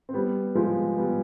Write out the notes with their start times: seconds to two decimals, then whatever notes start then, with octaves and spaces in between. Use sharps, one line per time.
0.09 C4
0.13 G3 B3
0.55 F3 G#3
0.98 G3 B3